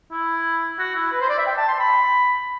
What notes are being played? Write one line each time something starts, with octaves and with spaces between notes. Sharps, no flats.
E4
F#4
E4
B4
C5
D5
E5
G5
A5
C6
B5